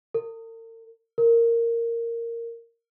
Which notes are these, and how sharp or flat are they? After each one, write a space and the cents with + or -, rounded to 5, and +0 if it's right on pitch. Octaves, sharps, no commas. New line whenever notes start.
A#4 -45
A#4 -10